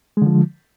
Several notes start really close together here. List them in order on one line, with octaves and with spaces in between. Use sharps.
G#3 D3 F3